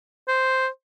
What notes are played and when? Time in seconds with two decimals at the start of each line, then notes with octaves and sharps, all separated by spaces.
0.28 C5